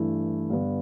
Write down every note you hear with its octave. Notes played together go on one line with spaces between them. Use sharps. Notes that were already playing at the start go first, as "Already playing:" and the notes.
Already playing: G2 E3 A3 E4
G2 D3 G3 B3 D4